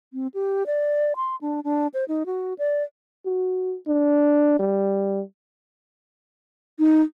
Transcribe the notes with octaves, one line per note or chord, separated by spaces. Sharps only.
C4
G4
D5
C6
D4
D4
C5
D#4
F#4
D5
F#4
D4
G3
D#4